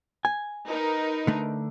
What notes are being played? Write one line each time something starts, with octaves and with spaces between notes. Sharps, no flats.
G#5
D#4 A#4 B4
D3 A3